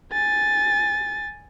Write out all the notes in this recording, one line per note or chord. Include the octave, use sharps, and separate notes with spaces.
G#5 A6